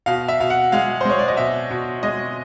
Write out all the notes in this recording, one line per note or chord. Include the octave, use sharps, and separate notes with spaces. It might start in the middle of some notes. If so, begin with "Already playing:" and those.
B2 F5
E5
B2 F5
F#5
G#3 F5
C5
G#3 C#5
D5
D#5
B2 E5
B2
G#3 D#5